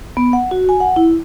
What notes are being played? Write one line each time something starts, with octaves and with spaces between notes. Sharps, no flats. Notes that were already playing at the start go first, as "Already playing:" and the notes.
B3
F#5
F#4
G#5
F#5
E4